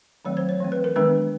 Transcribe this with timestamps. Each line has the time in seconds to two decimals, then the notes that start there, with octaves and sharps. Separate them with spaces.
0.25 D#3 F#3 A3 C4 C#5
0.37 C5
0.49 C#5
0.60 E3 A3 C4
0.72 B4
0.84 A#4
0.96 D#3 G#3 B3 D4 B4